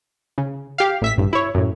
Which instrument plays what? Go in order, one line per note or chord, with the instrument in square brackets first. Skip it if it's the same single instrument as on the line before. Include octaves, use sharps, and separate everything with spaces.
[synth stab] C#3
G4 F5
A1 E5 B6
A1 G2
E4 C#5
F#2 A2